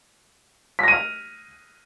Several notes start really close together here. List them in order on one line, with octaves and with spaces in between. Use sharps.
B6 A#6 D#7 F6